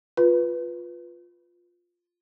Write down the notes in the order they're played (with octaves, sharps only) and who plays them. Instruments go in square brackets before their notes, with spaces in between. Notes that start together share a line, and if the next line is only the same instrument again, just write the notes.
[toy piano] F4 [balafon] B4